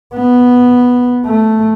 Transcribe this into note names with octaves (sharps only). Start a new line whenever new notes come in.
B3
A3